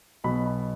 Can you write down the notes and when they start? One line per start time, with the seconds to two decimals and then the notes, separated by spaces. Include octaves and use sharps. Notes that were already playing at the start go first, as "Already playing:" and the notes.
0.24 B1 B2 F#3 B5
0.46 B5